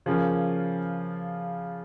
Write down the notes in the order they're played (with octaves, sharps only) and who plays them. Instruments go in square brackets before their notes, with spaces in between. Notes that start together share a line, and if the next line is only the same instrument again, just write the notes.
[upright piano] C#3 F3 A#3 C#4 F4